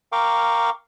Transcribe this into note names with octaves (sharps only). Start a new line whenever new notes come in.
A#4 F5 G5 C#6 D6